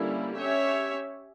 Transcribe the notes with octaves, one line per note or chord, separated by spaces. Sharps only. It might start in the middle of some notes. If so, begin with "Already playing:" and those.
Already playing: D3 G3 A#3 C#4 E4
C#4 G4 C#5 E5